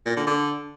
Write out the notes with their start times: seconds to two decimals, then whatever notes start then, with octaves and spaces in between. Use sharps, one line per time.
0.06 A#2
0.16 D3
0.27 D3